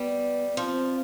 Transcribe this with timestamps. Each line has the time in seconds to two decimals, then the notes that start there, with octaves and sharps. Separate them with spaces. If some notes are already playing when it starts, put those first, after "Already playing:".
Already playing: G3 B3
0.57 F3 C4